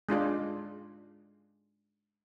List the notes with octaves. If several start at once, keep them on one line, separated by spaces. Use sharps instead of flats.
G#3 D4 F4 D5